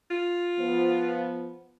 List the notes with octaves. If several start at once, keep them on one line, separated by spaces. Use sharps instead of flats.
F4
F3 B3